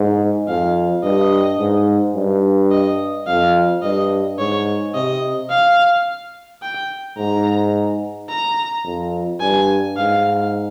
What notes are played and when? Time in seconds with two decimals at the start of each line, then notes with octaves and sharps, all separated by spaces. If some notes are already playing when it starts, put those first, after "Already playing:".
Already playing: G#2
0.48 F2 F5
1.04 G2 D#5
1.60 G#2
2.15 G2
2.71 D#5
3.27 F2 F5
3.83 G2 D#5
4.39 G#2 C#5
4.95 C3 D#5
5.50 F5
6.62 G5
7.18 G#2 A#5
8.29 A#5
8.85 F2
9.41 G2 G#5
9.97 G#2 F5